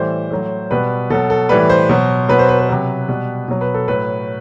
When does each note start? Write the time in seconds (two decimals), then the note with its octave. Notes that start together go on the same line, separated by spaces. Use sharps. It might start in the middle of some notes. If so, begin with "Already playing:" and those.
Already playing: A2 E3 G3 C5
0.31 A2 F#3
0.70 B2 G3 B4
1.10 B2 F#3 A4
1.30 A4
1.49 A2 E3 G3 B4
1.70 C5
1.89 B2 F#3
2.29 B2 F#3 B4
2.39 C5
2.49 B4
2.59 B4
2.69 C3 F#3
3.09 B2 G3
3.48 B2 F#3
3.61 B4
3.74 A4
3.88 A2 F#3 B4